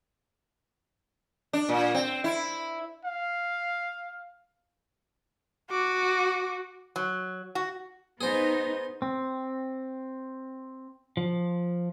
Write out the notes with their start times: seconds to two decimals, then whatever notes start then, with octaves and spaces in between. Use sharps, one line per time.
1.53 D4
1.69 A#2
1.94 C4
2.24 E4
3.05 F5
5.71 F#4 D6
6.96 F#3
7.55 F#4
8.21 B3 D#4 G#4 C5
9.02 C4
11.17 F3